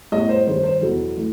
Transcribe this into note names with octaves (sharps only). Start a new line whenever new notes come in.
A2 G3 B3 D#5
C5
G2 D#3 G3 C5
C5
E2 B2 F#3 B3 A4
E3 A3